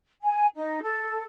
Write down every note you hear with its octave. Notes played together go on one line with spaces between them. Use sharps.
G#5
D#4
A4